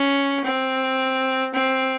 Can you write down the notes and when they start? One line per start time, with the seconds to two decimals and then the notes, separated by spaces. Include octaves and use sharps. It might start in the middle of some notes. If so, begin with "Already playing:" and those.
Already playing: C#4
0.45 C4
1.54 C4